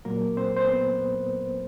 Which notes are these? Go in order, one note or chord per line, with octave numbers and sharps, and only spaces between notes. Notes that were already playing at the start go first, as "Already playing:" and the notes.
A#2 F#3 A#3 A#4
C4 C5
C5
B3 B4